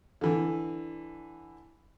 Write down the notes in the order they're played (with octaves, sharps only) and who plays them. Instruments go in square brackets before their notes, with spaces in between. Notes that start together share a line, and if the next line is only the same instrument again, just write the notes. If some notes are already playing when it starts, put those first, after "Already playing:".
[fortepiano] D3 E3